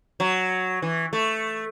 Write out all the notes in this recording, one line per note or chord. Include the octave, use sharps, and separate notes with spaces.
F#3
E3
A3